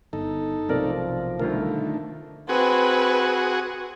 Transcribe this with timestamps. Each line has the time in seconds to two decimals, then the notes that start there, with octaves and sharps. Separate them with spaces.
0.13 G1 D#4 A4
0.69 B1 C3 F3 A3 A#4 D5
1.39 C2 D3 D#3 A3 F4 A#4
2.49 C4 F#4 G#4 B4